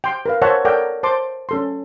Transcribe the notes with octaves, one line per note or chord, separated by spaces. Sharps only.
G5 C6
A#4 B4 F5
A#4 C5 C#5 E5 F#5 A5
A4 A#4 C#5 D5 F#5 G5
C5 A5 C6 D6
C#4 A4 C6